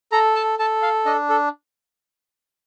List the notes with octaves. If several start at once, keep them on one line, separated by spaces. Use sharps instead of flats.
A4 A#5
A5
A4 A5
F5
D4 D#5
A4